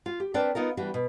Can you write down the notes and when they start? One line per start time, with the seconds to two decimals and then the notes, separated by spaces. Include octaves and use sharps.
0.06 F4
0.20 G4
0.34 C4 D4 A#4 B4 D5
0.55 B3 D#4 F4 A#4
0.77 E3 G3 D4 F#4
0.94 B2